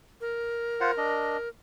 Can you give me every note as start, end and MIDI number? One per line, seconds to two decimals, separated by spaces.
0.21 1.49 70
0.81 0.91 65
0.81 0.91 72
0.81 0.91 78
0.98 1.37 62
0.98 1.37 75